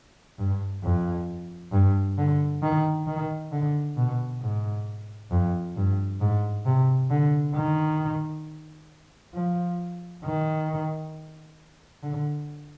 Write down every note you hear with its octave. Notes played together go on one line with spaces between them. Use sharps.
G2
F2
G2
D3
D#3
D#3
D3
B2
G#2
F2
G2
G#2
C3
D3
D#3
F3
D#3
D3